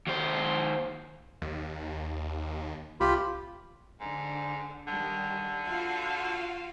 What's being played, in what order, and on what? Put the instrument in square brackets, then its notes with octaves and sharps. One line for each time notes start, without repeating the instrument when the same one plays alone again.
[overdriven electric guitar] D#2 C5
[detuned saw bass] D#2
[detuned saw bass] C2 [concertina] F4 G4 B5
[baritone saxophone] G#2 [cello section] D3
[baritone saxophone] D3 [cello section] D#3 G3
[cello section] F4 F#4 F5